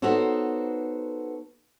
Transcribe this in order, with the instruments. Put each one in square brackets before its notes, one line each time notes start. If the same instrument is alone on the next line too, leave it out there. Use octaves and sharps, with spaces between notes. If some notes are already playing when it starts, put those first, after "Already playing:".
[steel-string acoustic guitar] B3 D#4 F#4 A4 C5 C#5